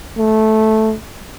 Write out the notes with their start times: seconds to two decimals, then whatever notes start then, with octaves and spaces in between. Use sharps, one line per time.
0.17 A3